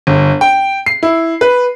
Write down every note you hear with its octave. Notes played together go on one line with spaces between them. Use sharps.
G1
G5
C7
E4
B4